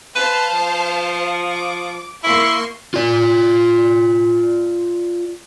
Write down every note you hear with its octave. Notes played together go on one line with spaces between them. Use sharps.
B4 C5 F5 A5
F3
D6
A#3 E4 C6 C#6
F4 D5